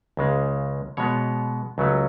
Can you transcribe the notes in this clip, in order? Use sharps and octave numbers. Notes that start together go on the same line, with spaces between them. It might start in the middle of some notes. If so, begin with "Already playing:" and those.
C#2 C#3 G#3
B2 G#3 B3 C#5
C#2 C#3 F#3 A3 C#4